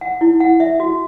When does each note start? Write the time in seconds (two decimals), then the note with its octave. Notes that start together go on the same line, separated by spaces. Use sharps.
0.01 F#5
0.21 E4
0.40 F#5
0.60 E5
0.80 F#4